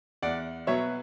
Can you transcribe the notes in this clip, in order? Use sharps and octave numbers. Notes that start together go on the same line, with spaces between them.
E2 D5 F#5
B2 F#3 B3 C#5 E5